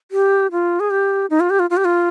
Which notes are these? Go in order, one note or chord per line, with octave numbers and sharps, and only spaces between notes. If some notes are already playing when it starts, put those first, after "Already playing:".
G4
F4
G#4
G4
D#4
F4
G4
F4
F4
G4
F4